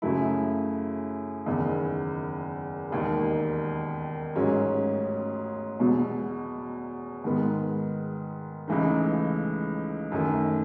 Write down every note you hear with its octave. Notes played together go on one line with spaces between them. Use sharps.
F#2 C#3 F#3 A3 E4
F#1 E2 D#3
E1 D#2 D#3
A1 G#2 F#3 C#4 G#4
E2 B2 F#3
G#2 D#3 G#3 B3
C#2 C#3 E3 A3 D#4
F#2 D#3 A3